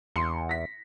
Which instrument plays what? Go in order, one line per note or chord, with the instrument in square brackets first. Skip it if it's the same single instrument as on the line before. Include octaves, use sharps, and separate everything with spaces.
[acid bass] E2 [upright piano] C6 C#7
[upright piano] A#6 B6